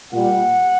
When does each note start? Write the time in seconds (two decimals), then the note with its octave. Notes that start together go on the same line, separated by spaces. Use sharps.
0.11 A#2 G3 F#5